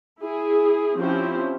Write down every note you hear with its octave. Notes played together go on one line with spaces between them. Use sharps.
E4 G#4
F3 C4 C#4 E4 G4 C5